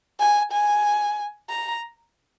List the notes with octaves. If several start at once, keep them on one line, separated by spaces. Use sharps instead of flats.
G#5
G#5
A#5